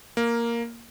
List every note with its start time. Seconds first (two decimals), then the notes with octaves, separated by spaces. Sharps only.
0.17 A#3